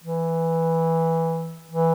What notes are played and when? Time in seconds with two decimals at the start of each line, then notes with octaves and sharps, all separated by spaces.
0.04 E3
1.71 E3